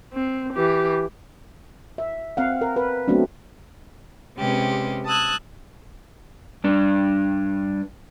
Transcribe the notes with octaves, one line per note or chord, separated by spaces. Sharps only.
C4
E3 G4
E5
C4 F5 F#5
A#4
B4
F#3 A3 B3 C4 D4
C3 G#3 C#4 G4 B4
A5 D#6 E6 F#6 G#6
G2 D4